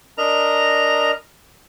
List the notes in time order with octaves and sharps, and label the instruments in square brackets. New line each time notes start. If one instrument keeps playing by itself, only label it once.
[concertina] D4 A#4 D#5 A#5